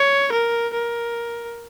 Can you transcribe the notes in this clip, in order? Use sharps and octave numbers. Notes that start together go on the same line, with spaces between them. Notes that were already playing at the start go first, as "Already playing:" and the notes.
Already playing: C#5
A#4
A#4